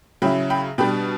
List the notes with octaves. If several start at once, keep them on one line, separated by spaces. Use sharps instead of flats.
C#3 F#3 C#4 E4 G5 B5
G5 B5
B2 G3 D4 G5 B5